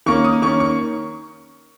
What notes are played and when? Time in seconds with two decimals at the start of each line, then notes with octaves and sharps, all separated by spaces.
0.06 D#3 A#3 C#4 C#6
0.25 D#6
0.42 D#3 A#3 C#4 C#6
0.60 C#6